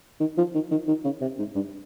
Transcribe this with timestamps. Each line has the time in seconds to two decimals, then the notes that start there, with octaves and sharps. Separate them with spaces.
0.20 D#3
0.38 F3
0.55 D#3
0.71 D#3
0.88 D#3
1.05 C#3
1.22 C3
1.39 G#2
1.55 G2